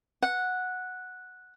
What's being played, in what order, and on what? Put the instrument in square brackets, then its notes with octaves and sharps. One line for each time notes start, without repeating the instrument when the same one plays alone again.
[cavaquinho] F#5